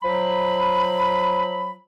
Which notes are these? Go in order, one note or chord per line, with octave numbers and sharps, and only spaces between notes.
F3 F#3 B5